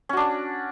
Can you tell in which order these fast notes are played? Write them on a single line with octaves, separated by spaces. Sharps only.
C#4 F#4 D4 D5